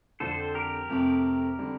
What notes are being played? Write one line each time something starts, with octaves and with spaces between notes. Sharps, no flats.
F2 D3 F3 C4 A4 C5
G4 A#4
F2 C3 F3 A3 C4
D3 G3 C4